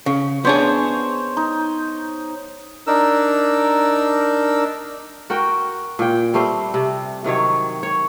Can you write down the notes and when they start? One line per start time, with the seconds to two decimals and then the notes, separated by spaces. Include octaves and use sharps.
0.06 C#3
0.45 B3 D4 G#4 C5 C#5
1.37 D#4
2.87 D4 D#4 A#4 E6
5.30 F#4 A#4 G5
5.99 A#2 G5
6.34 G3 A3 C4 C5
6.74 C3
7.24 C3 D#3 F#3 C#5
7.83 C#5